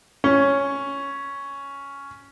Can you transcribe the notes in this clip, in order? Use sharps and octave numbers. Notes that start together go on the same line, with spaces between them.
C#4